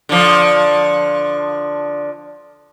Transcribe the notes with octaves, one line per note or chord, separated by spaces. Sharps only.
D3 F3